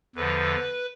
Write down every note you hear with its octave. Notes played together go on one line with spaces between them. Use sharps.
E2 D3 F3 B4